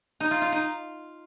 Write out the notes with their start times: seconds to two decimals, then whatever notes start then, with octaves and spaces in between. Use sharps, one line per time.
0.20 D#4
0.31 F4
0.42 F4
0.52 D#4